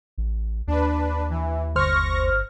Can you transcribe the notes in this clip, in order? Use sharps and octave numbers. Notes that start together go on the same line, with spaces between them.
A1
D#2 D4 B4
E3
G1 C5 C#6 F6 A#6